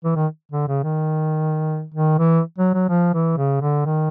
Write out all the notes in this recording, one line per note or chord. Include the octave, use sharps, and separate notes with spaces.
E3
D#3
D3
C#3
D#3
D#3
E3
F#3
F#3
F3
E3
C#3
D3
D#3